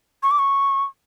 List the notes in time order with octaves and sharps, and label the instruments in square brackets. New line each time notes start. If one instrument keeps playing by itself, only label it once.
[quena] C#6
D6
C#6